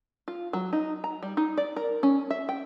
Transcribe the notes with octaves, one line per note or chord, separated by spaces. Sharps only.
F4
F#3
D#4
A#5
G3
D#4
D5
A#4
C#4
E5
G5